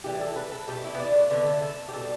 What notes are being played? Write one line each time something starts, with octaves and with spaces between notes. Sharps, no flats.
A2 E3 G3 G4
A4
B4
A4
B2 A3 G4
E4
B3
D4
A3
D3 A3 B3
E4
A4
G4
B2 G3 A4